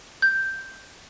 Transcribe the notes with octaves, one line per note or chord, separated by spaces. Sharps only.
G6